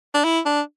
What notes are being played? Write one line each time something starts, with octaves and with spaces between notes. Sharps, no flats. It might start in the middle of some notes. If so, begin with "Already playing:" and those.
D4
E4
D4